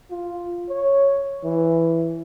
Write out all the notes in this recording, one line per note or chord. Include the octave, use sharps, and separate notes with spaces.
F4
C#5
E3